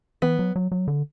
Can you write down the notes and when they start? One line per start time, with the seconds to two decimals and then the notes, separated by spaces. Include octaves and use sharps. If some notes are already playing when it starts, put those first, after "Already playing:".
0.22 E3 B3
0.39 F#3
0.56 F#3
0.72 F#3
0.88 D3